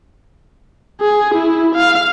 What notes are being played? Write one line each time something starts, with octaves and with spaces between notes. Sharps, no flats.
G#4
E4
F5